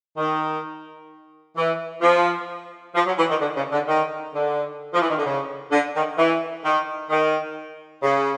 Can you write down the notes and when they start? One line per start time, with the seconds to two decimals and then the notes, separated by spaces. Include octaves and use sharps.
0.17 D#3
1.56 E3
2.01 F3
2.94 F3
3.05 F#3
3.18 E3
3.29 D#3
3.40 D3
3.56 C#3
3.72 D3
3.87 D#3
4.33 D3
4.93 F3
5.01 E3
5.09 D#3
5.16 D3
5.24 C#3
5.70 D3
5.95 D#3
6.18 E3
6.64 D#3
7.09 D#3
8.02 C#3